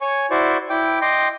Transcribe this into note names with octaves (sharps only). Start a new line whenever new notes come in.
C#5 G#5 C#6
E4 F#4 C5 D5 C#6
E4 G5 D6
D#5 G5 C6 D6